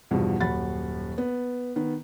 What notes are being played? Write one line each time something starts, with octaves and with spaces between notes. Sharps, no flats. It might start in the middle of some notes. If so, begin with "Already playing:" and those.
E2 G2 B2 F3
D#1 F#2 F#5 B5 A6
B3
D#3 B3